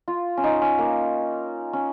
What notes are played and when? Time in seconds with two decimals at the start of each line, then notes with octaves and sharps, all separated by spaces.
0.08 F4
0.37 C#4
0.44 D#4
0.62 C#4
0.79 A#3
1.73 C#4